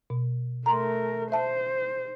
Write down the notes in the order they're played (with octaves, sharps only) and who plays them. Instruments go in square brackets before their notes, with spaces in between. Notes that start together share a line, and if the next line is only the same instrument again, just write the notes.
[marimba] B2
[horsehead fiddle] A3 A#4 [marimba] A#5 C6
[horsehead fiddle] C5 [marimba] E5 A5